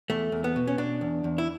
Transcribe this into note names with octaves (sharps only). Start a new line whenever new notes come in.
E2 A3
E2
B3
B2
C#4
B2 D4
E2
E2
E4